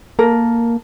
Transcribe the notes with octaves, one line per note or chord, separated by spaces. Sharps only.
A#3 A4 A#4